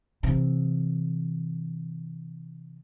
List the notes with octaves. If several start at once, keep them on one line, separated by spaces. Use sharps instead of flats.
C3 E3